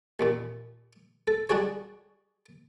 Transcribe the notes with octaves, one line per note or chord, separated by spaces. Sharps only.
A1 D#2 A#2
A4
G3 D4 F#4 G#4 C#5